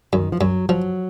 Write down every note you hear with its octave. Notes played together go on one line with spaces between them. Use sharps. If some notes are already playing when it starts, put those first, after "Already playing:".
F#2 D#3
F3
F#2 F#3
F3 F#3